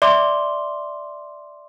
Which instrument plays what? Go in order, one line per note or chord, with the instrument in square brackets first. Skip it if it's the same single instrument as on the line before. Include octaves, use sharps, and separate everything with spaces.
[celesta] D5 E5 C6 D6 G7